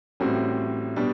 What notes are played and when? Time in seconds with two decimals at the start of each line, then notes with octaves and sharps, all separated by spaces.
0.20 A1 A2 G3 C4 F#4
0.96 B2 G3 D4